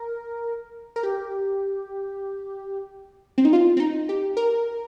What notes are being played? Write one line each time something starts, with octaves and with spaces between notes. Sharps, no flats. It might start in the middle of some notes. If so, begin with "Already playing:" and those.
Already playing: A#4
A#4
G4
C4
D#4
F4
C4
D#4
G4
A#4